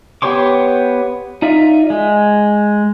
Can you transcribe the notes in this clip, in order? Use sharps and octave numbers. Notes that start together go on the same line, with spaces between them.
B3 G4 C#5 C6 D6
D#4 F4 D5 E5
G#3